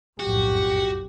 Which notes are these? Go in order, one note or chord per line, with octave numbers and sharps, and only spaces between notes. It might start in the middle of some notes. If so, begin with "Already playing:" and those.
F#1 B1 F2 A2 F#4 G4